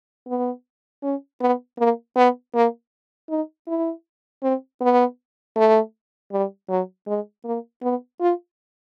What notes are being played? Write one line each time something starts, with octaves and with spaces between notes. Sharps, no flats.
B3
C#4
B3
A#3
B3
A#3
D#4
E4
C4
B3
A3
G3
F#3
G#3
A#3
B3
F4